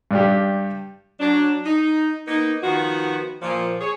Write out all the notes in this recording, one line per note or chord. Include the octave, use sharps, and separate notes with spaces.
G2 D4 G4
F#3 D4
D#4
A#3 B3 D#4
D#3 F3 B3 F#4
A#2 F3
G#4 C#5